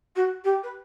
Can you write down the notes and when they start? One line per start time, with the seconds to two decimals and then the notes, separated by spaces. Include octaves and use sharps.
0.16 F#4
0.44 G4
0.63 B4